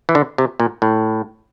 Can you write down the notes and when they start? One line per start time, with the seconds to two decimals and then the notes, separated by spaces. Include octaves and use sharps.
0.09 E3
0.15 D3
0.38 C3
0.60 A#2
0.82 A2